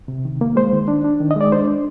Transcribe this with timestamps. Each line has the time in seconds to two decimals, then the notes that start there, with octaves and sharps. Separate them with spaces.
0.08 C3
0.25 D#3
0.41 A#3
0.56 G#3 C5
0.73 D#3
0.88 D4
1.04 D4
1.20 D#3
1.31 D#5
1.36 G#3 D5
1.52 D4 C5
1.67 D4